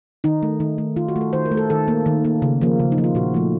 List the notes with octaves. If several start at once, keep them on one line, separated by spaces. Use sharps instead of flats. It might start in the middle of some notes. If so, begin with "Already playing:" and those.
D#3 D#4
A3
D#3
A3
D#3 F4
F#4
A3
A4
D#3 C5
A#4
A3
A4
D#3 A4
A#3
D#3
A#3
C#3
F3 A#3
C#3
D#4
F3 A#3
F4
A#2 F#4
F3 A3